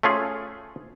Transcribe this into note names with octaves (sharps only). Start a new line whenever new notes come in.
A3 C#4 F4 G#4